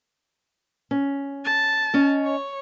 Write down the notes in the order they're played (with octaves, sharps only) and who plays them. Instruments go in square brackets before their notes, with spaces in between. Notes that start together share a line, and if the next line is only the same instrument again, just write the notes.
[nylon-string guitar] C#4
[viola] A5
[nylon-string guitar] C#4 D#5
[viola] C#5